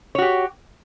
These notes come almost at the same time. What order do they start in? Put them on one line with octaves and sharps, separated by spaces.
C#5 F#4 G4